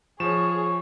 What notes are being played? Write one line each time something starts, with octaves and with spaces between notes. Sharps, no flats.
F3 G#4 C#5 C#6 E7